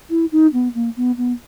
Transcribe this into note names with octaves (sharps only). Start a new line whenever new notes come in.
E4
D#4
B3
A#3
B3
B3